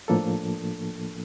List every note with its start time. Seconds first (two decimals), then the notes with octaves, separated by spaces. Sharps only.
0.08 A2 F3 A#3 D4 A4